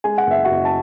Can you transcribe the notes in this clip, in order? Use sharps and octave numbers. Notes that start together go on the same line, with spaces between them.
G#3 G#5
F#5
F#1 E5
F#4 F#5
F#1
A5